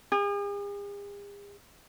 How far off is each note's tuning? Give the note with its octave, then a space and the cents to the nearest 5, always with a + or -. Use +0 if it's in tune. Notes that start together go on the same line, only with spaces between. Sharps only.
G#4 -45